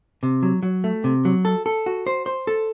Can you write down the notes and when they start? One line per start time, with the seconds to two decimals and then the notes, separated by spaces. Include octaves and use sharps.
0.23 C3
0.43 F#3
0.63 F#3
0.84 A3
1.04 C3
1.25 F#3
1.45 A4
1.66 A4
1.86 F#4
2.07 C5
2.26 C5
2.47 A4